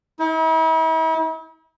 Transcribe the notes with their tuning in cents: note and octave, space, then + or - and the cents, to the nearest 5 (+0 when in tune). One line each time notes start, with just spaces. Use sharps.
E4 -45